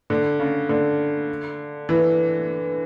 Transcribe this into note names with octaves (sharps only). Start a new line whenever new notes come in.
D3
C#3
D3
E3